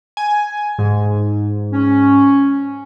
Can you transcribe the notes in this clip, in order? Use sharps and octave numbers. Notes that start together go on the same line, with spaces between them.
G#5
G#2
C#4